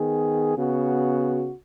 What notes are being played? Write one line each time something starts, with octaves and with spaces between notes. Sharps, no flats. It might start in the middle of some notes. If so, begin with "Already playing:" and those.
Already playing: D#3 B3 G#4
C#3 B3 F#4